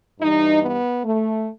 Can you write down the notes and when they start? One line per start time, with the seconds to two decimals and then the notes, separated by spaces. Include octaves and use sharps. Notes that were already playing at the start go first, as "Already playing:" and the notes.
0.20 G2 E3 G3 D#4
0.62 B3
1.05 A3